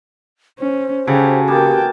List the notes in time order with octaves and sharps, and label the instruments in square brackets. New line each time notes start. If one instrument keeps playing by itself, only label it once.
[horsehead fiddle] C#4 [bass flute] C5
[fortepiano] C#3 [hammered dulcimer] F#4 A4 G#5 [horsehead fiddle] G4
[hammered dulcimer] A#3 B3 [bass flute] G4 [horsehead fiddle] G5 A5